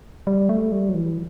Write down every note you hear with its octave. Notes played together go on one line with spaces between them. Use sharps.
G3
A3
G3
F#3
E3